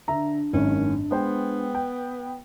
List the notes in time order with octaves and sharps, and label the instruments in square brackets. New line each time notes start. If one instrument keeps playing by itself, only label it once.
[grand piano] D3 E5 A#5 [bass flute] D4
[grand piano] G#1 F#2 D#3 [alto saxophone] C#4
[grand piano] G#3 C5 G5 [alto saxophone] B3
[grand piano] G5